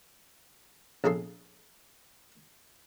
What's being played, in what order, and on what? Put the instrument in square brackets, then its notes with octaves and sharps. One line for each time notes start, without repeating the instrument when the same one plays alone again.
[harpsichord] A#1 C#3 G#4 A4 C6